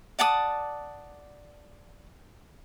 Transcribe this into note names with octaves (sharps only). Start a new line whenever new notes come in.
D5 F#5 A5 D#6